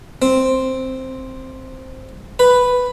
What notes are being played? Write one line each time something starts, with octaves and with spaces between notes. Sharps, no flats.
C4
B4